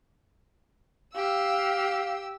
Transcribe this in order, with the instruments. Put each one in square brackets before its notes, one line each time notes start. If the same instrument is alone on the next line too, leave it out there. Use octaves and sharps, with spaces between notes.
[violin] G4 E6 [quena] F5